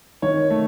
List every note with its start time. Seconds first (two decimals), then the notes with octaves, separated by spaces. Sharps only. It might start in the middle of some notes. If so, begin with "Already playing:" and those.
0.22 D#3 C#5
0.50 A3